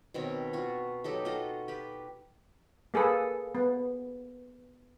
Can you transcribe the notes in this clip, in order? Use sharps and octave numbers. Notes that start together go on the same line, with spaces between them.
B2 D#3 C4 C#5
F4 F#4
F#3 D#4 G4 A4
F4 F#4 A4 D#5
G4 B4
A#3 G#4 A4 B4
B3